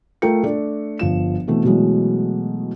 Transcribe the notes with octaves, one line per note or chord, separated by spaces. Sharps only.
A3 F4 A4 A#4 G5 C#7
A3 D4 A4 D5
G1 F3 E7
B2 E3 A3 C4
B2 E3 F#3 G#3 A3